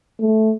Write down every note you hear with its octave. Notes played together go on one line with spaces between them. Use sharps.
A3